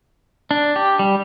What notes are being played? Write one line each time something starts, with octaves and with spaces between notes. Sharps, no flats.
D4
G4
G3